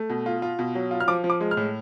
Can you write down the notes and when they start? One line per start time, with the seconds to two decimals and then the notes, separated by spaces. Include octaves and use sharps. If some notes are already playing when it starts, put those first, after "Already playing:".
Already playing: A3
0.10 B2
0.26 F4
0.42 F4
0.59 B2
0.75 F#3
0.91 F4
1.00 F6
1.08 F3 D6
1.24 F3
1.30 D6
1.41 G#3
1.51 F6
1.57 A2